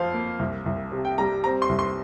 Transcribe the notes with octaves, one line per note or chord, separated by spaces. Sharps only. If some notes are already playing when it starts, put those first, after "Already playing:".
Already playing: F2 F3 C5 F5
A#3
C2
C2
C3
G5
G3 A#5
C4 A#5
C6
C2
C6